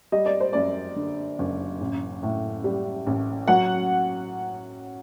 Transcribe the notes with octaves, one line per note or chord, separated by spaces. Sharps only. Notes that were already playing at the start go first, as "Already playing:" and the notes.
G3 D#5
D5
C5
F#2 D5
D3
F#1
A1
A2
G3
A1
F#3 F#5